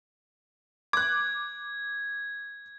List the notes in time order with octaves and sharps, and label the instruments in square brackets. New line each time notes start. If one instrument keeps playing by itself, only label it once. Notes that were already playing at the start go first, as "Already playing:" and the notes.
[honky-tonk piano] D6 F#6 [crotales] G#6